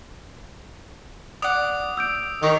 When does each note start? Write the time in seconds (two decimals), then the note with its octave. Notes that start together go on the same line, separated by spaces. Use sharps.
1.42 D5 F#5 D#6
1.97 E6 G6 D7
2.43 D#3 G4 A#4 C#5